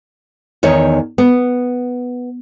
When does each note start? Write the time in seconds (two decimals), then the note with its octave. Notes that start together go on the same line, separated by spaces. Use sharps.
0.63 E2 D#3 D#4 C#5
1.18 B3